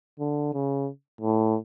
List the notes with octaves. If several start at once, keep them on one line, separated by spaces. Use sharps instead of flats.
D3
C#3
A2